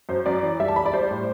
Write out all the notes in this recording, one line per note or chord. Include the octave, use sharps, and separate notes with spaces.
F#2 C5
F#2 D5
E3
G3 E5
A5
G3 B5
D5
G3 C5
A2